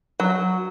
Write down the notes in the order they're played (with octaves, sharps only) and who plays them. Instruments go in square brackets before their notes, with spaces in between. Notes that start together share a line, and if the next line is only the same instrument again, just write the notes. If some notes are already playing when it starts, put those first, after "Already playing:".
[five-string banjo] F#3